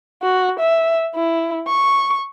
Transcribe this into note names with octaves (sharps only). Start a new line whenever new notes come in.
F#4
E5
E4
C#6